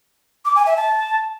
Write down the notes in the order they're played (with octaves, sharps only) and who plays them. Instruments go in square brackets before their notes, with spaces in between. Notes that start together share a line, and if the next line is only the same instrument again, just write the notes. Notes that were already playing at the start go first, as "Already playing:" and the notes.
[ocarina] D6
G#5
E5
A5